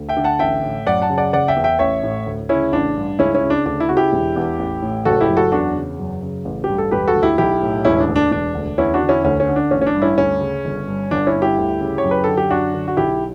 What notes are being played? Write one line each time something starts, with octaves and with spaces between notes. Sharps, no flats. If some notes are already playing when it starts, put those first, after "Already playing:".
Already playing: D2
E5 G5
D3
F#5 A5
A1 E5 G5
A2
F#2 D5 F#5
F#5 A5
C#3
D5 F#5
F#1 D5 F#5
E5 G5
E2
E5 G5
A1 C#5 E5
A2
D2
C#3 C#4 E4
A1 D4
G2
C#2 C#4 E4
C#4 E4
C#3
D4
D2 D4
E4
C#3 F#4
E4 G4
E1
E2
A1
A2
F#1 F#4 A4
E4 G4
F#2
F#4 A4
E2 D4 F#4
C#3
F#2
C#3
A1
G2 G4
A4
E1 G4 B4
F#4 A4
D2
E4 G4
B1 E4 G4
A2
E1 C#4 E4
D4
D2
D4
E1 D4
D2
E2 C#4 E4
D4 F#4
D3
C#4 E4
D2 C#4
C#4
D3
D4
A1 C#4
C#4
D4
G2
C#4 E4
D2 C#4
C#3
G1
G2
G1 D4
C#4 E4
G2
E4 G4
D2
C#3
C#5
F#2
B4
D3 A4
G4
F#2 D4 F#4
D3
F#4
B1 E4 G4